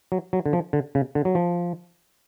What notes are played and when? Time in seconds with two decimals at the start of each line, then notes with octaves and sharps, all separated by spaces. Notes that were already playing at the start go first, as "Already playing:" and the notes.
0.12 F#3
0.33 F#3
0.46 D3
0.53 F3
0.73 D3
0.95 C#3
1.15 D3
1.25 F#3
1.35 F3